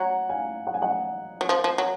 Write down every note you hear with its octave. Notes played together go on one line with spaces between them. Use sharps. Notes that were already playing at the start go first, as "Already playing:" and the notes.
Already playing: F#3 F#5 A#5
F5 G#5
F#5
G#5
D#5 F#5
F#3
F3
F3
F#3